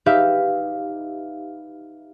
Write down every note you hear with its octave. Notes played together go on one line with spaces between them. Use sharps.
D#4 G4 B4 E5 F5